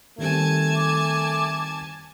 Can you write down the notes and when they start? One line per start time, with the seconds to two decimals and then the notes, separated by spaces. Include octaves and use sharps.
0.18 D#3 G3 A3 C4 G#5 A5 G#6
0.76 D6